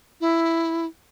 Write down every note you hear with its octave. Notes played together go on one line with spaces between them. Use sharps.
E4